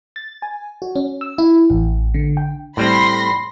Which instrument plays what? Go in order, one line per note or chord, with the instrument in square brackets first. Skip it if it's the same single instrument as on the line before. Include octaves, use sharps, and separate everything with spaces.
[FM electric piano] A6
G#5
F#4
C#4
E6
E4
A1
D3
G5
[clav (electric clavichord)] A2 G3 C4 [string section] B5 C6 A#6